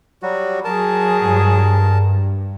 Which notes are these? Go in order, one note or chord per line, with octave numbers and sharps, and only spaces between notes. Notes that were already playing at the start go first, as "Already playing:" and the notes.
F#3 G3 F#4
F#3 G#4 A#4 A5
G2